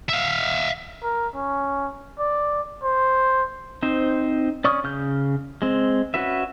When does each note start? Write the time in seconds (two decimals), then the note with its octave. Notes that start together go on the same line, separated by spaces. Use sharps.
0.09 E5 F5
1.03 A#4
1.35 C#4
2.19 D5
2.83 C5
3.83 C4 D#4 C5
4.64 C#4 D5 C#6 D#6 F6
4.84 C#3 F6 G6
5.62 G#3 C4
6.14 C#4 F#4 B4 E5